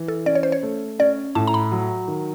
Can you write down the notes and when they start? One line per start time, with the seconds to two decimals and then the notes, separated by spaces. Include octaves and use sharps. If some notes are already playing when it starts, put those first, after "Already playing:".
Already playing: E3
0.08 A4
0.26 C#4 D5
0.35 C#5
0.43 C5
0.52 C#5
0.63 A3
0.99 C#4 D5
1.35 A2 A5
1.47 A#5
1.54 B5
1.72 F#3
2.08 D#3